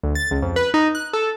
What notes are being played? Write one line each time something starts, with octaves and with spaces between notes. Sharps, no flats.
D2
A6
C#2
F2
B4
D#4
F#6
A4